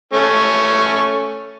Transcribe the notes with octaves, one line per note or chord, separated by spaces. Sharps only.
A3 C#4 C#6